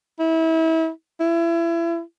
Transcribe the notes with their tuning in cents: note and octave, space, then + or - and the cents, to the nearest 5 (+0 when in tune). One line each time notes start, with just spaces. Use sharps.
E4 -30
E4 +30